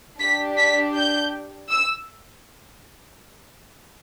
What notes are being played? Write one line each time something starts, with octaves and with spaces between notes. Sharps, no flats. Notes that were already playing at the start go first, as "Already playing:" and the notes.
D4 G4 B6
B6
G6
E6